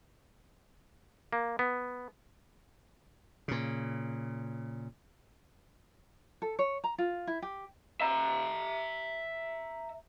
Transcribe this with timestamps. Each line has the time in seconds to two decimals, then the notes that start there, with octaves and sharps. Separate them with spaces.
1.33 A#3
1.59 B3
3.48 A#2 C#3
6.42 A4
6.59 C#5
6.84 A#5
6.98 F4
7.27 E4
7.42 G4
8.01 E5 A#5